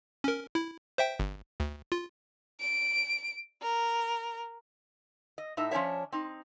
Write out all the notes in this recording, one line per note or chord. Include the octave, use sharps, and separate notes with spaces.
C#4 A#4
E4
C5 E5 G5
G1
D2
F4
D7
A#4
D#5
A2 D#4 E5
F3 C#4 D4 C#5 E5
C4 D#4